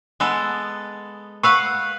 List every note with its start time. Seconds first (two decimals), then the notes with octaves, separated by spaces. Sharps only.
0.20 G#3 B3 A4
1.43 B4 F5 F#5 C#6 E6 C7